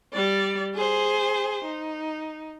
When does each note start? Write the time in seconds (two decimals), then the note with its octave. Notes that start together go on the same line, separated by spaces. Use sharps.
0.13 G3 D5
0.74 G#4 C5
1.65 D#4